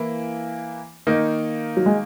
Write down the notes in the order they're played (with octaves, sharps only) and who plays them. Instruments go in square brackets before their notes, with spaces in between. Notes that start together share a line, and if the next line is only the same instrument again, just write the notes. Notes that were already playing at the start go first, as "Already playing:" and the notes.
Already playing: [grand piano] E3 A#3 E4
D#3 A#3 D#4
[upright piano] F#3
G#3